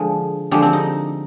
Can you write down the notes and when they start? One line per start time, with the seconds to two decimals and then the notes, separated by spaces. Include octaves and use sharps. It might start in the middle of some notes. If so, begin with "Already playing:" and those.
Already playing: D3 F3 G#3 G#4
0.51 D3 F3 G#3 G4
0.62 C4
0.73 D#4